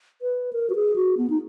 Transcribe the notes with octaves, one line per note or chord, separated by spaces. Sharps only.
B4
A#4
F#4
G#4
F#4
B3
D#4